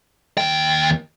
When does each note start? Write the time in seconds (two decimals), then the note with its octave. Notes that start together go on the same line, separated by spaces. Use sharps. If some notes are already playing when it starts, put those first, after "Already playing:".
0.38 D#2 G5